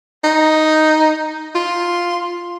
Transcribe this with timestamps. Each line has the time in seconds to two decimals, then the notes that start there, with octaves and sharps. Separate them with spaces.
0.24 D#4
1.55 F4